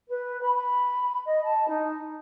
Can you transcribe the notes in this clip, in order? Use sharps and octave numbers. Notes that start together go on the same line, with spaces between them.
B4
B5
B5
D#5
A5
D#4